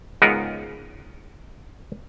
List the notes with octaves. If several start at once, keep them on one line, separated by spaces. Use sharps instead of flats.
C#2 G#2 B3 A#4 D#5 F#5